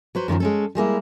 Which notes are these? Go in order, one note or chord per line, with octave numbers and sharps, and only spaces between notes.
F#3 B4 C5
F#2 D3 D#3 F3
G#3 C#4 A4
G3 G#3 A#3 E4